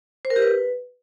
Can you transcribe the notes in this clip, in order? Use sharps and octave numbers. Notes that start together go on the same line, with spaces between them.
C5
A#4
G4
B4